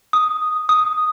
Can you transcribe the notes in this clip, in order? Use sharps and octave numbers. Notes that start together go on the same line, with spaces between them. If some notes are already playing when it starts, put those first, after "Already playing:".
D#6
D#6